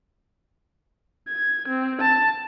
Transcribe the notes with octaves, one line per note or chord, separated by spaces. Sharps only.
G#6
C4
A5